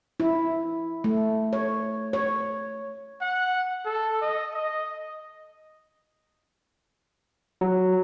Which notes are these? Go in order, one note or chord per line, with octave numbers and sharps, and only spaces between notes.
E4
A3
C#5
C#5
F#5
A4
D#5
D#5
F#3